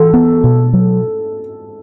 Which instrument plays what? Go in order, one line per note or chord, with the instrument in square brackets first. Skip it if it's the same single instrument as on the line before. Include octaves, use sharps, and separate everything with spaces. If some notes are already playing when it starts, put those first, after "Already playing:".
Already playing: [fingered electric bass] E3 [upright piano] A4
[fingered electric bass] B3
B2
F#3